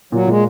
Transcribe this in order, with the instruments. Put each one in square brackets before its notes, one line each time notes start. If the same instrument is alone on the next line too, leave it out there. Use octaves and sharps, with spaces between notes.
[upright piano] A#2 [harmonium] F#3
[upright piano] A#2 [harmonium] G#3